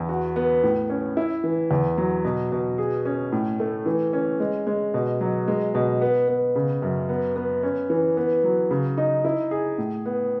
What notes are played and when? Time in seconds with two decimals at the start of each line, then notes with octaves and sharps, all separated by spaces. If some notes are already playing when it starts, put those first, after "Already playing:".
Already playing: E2
0.09 F#4
0.36 B3
0.63 A2
0.90 C#4
1.17 E4
1.44 E3
1.71 E2
1.98 F#3
2.25 B2
2.52 B2
2.78 G#4
3.05 C#4
3.32 A2
3.60 A3
3.86 E3
4.13 C#4
4.40 G#3
4.67 G#3
4.94 B2
5.21 F#3
5.48 G#3
5.75 B2
6.02 B3
6.28 B3
6.55 C#3
6.82 F#2
7.09 B3
7.36 B3
7.63 C#4
7.90 E3
8.17 B3
8.44 F#3
8.71 C#3
8.98 D#4
9.25 E4
9.51 G#4
9.78 A2
10.06 B3